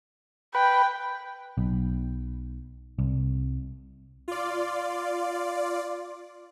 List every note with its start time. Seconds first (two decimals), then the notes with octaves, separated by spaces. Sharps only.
0.55 B4 G5
1.58 B1
2.99 C2
4.28 F4 D5